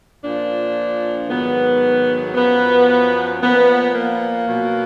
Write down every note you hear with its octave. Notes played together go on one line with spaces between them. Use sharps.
A#2 F3 D4
G#2 D#3 F#3 B3
F#2 F3 B3
A#2 F3 B3
A#3
B2 F#3